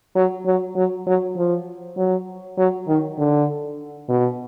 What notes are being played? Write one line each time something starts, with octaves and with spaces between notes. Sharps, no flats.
F#3
F#3
F#3
F#3
F3
F#3
F#3
D#3
D3
B2